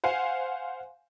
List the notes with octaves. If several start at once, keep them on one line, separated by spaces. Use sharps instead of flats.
C5 F5 F#5 G#5